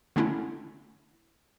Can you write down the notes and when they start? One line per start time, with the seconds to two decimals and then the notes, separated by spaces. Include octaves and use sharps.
0.16 D3 A3 B3 C#4 D4 E4